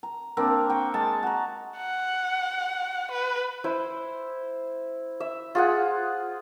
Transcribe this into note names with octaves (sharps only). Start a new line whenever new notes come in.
A#5
A#3 C4 D4 A#4
G5 C#6
G#3 F5 A5
F#4 A#5
F#5
B4
E4 C5
E5
F4 G#4 F#5